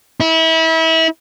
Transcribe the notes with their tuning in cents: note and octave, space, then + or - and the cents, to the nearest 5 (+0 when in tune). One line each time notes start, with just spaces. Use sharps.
E4 -30